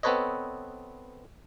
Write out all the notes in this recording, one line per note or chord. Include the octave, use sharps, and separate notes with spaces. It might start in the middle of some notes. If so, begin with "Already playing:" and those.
B3 C4 A4 B4 C#5 D#5